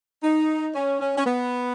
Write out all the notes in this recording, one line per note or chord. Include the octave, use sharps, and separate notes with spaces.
D#4
C#4
C#4
C#4
B3